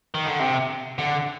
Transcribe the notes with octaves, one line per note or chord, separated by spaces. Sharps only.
D#3
D3
C3
D3